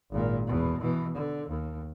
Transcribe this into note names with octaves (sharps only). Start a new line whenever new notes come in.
G#1 A#2
E2 B2
B2 E3
D3
D#2